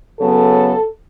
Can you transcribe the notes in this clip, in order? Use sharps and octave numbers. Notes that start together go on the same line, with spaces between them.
C#3 F#3 B3 A4